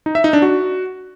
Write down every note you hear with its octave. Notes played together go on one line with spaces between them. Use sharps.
D#4
E5
D#4
D4
F#4